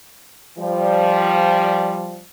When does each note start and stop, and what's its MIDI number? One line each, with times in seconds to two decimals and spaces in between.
0.58 2.21 53
0.58 2.21 55